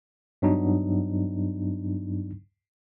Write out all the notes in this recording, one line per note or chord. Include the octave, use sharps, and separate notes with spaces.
G2 F#3 B3 D4 D#4